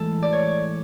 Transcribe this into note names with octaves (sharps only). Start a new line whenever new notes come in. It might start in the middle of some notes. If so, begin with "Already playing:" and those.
Already playing: A2 E3 G#3 A4
D5
C#5